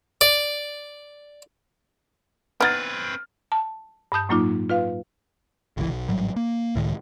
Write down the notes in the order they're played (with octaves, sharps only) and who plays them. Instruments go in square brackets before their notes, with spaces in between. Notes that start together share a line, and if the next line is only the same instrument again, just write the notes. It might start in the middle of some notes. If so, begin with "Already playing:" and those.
[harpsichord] D5
[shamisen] B3 D#4 [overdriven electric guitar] C4 B4 [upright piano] F6 G#6 A6
[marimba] A5
G2 A5 D#6 G6
A2 F#3 A#3 D#4 F4 D6
F4 B4 F5
[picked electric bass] G#1 C#2 D#3 E3
B1
A1 G#2 F#3 G3
A#3
C#2 A2 D#3